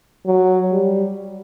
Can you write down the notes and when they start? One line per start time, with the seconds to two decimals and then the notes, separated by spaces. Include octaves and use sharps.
0.26 F#3
0.73 G3